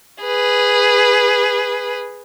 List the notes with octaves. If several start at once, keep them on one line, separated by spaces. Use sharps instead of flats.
G#4 B4